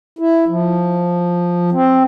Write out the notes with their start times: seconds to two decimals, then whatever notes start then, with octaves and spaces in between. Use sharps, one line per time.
0.19 E4
0.48 F3
1.72 C4